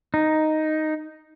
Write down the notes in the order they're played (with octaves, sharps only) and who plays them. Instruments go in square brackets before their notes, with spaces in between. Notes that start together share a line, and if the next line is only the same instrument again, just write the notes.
[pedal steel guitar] D#4